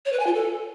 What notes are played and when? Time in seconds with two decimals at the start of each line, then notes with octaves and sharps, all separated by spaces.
0.06 C#5
0.13 B4
0.20 G#5
0.27 F4
0.34 A4